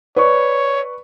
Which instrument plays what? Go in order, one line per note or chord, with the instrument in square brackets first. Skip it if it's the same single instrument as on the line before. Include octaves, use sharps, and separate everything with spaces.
[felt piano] B4 D5 C#6 [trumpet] C#5